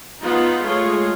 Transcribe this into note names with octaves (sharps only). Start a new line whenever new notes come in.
B3 D#4 F4
G#3 A3 F4 G#4 C#5